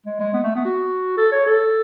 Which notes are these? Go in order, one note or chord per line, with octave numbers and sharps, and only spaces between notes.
G#3
G#3
B3
A3
B3
F#4
A4
C#5
A4